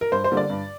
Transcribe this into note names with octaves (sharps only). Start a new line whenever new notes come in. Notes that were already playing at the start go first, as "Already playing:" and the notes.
A#4
G2 C5
C5
D3 G3 A#3
D5
G2